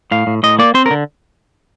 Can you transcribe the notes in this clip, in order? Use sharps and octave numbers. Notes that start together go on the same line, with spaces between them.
A2 F5
A2
A2 D#5
A#3 D5
C4 C5
A#4
D3